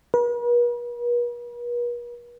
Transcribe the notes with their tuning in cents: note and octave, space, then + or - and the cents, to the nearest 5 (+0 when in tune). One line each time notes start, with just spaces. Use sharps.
B4 -45